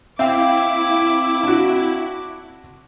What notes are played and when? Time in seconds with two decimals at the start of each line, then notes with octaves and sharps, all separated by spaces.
0.19 C4 E4 E5 F5 G5 D6
1.44 D4 F#4